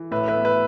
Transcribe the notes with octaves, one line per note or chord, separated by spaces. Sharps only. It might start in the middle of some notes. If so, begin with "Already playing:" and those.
Already playing: E3
A2 B4 E5
B4 E5
B3
B4 E5